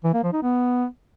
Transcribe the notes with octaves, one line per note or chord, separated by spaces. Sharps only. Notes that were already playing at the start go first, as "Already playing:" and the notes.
E3
A#3
F3
D#4
B3